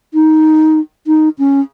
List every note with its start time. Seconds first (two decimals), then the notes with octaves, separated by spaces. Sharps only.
0.14 D#4
1.07 D#4
1.39 C#4